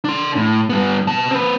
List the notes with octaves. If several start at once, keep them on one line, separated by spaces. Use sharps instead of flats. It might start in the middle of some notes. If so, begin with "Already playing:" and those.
D4 C6
A2
G2 B3
B2 A5
C4 B4